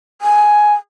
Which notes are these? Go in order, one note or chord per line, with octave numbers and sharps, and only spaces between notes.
G#5